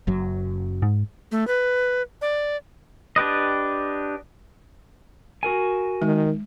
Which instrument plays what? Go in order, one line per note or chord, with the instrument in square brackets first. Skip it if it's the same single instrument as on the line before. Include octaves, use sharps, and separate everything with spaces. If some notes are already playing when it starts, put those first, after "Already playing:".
[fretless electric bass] F#1 F#2 F#3
[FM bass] G#2
[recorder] A3
B4
D5
[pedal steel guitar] D4 G4 B4 D#5
[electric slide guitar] F#4 A#4 G#5
[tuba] D#3 [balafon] G#3